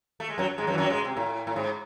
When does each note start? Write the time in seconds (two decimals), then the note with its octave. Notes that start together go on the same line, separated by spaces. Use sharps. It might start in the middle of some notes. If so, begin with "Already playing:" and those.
0.20 A3
0.30 G#3
0.38 F#2 F#3
0.58 G#2 G#3
0.67 F#2 F#3
0.73 E3
0.78 F#2 F#3
0.90 G#2 G#3
1.05 C3
1.17 A2
1.47 A2
1.56 G#2